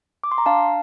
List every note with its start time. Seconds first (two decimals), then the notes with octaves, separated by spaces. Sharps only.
0.24 D6
0.31 C6
0.38 A#5
0.46 D4 F5 A5